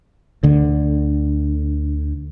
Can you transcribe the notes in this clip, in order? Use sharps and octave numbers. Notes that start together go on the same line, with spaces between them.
D2 D3